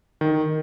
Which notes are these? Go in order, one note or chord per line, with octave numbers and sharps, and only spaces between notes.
D#3